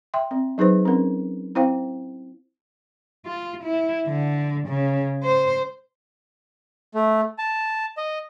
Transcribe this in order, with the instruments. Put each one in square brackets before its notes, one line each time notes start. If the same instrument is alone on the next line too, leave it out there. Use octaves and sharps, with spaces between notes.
[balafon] E5 G5 C6
C4
F#3 D#4 G#4 B4 C5
C4 C#4 A#4
C4 E4 C5 F5 G5
[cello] F4
E4
D3
C#3
C5
[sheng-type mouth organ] A3
A5
D#5